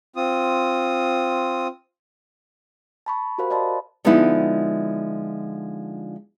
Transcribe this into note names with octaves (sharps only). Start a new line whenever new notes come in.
C4 F4 D#6
A5 B5 C#6
F#4 G4 A#4 C5 F5 B5
D5 D#5 F5 A5 B5 C6
D3 F3 G#3 B3 D#4 E4